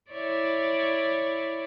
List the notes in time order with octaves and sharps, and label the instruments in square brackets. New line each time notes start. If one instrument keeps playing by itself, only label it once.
[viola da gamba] E4 C#5 D5